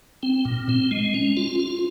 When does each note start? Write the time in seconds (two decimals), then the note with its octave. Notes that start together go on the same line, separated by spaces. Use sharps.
0.23 C4
0.45 A#2
0.69 C4
0.91 G#3
1.14 C#4
1.37 F4
1.59 F4